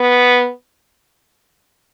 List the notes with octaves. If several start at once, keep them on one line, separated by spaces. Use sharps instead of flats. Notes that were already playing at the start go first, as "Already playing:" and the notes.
Already playing: B3